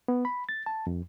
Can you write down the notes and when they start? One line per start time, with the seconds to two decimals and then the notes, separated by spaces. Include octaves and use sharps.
0.08 B3
0.25 B5
0.49 A6
0.66 A5
0.87 F2